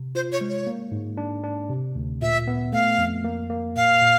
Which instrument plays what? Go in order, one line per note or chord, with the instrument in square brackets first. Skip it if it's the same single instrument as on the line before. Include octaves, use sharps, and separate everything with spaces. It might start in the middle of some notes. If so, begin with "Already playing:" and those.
Already playing: [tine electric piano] C3
[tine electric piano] F4 [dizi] C5
[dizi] C#5
[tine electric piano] G#3
[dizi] C#5
[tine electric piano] A#3
G#2
D4
D4
C3
D2
[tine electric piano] A#2 [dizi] E5
[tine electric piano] B3
[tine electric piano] A3 [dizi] F5
[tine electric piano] F2
A#3
A#3
[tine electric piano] A#2 [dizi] F5
[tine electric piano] A#2